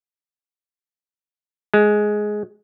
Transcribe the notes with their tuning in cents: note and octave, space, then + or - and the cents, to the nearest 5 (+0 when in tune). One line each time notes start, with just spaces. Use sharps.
G#3 +10